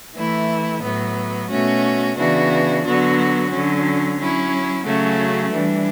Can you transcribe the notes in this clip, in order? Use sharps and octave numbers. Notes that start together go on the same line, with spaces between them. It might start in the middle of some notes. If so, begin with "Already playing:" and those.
E3 A3 E4
A2 F#3 B3
B2 A3 C#4 F#4
C#3 E3 B3 D4 F#4
D3 F#3 B3 F#4
D3 F#3 C#4
F#3 C#4 E4
C#3 F#3 A3 C#4 F#4
E3 G3 D4